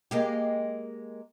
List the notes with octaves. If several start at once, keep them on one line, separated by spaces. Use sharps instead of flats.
G#3 A#3 G4